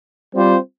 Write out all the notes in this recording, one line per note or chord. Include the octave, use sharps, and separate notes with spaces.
G3 C4 F4 C5